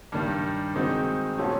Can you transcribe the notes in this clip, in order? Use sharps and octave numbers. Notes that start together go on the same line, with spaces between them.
G2 D#3 G3
D#3 G#3 C4 D#4 F#4
A#2 F#3 A3 C#4